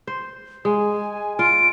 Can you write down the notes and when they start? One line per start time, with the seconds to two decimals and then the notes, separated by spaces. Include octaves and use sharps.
0.07 C5
0.65 G#3 G#5
1.39 F4 D7